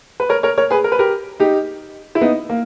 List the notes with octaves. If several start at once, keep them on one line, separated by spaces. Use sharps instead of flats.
B4
A#4 C#5
A#4 C#5
A#4 C#5
G#4 B4
A#4
B4
G4 A#4
D#4 G4
E4
B3 D#4
A#3